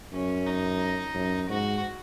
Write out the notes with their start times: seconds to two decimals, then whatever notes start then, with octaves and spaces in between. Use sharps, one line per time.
0.12 F#2 C#4
0.47 D#4
1.15 F#2
1.49 G#2 F#4